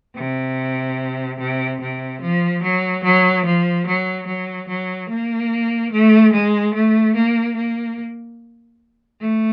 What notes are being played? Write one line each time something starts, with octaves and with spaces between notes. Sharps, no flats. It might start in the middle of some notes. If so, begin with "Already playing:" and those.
C3
C3
C3
F3
F#3
F#3
F3
F#3
F#3
F#3
A#3
A3
G#3
A3
A#3
A#3
A3